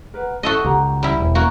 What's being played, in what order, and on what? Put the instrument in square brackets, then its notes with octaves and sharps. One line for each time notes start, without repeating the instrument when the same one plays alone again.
[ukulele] A#4 B4 F#5
[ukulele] E4 [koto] F#4 A4 D#5
[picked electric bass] C#2 [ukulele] G4 F#5 A#5
[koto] G3 E4
[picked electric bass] E1
[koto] A#3 F#4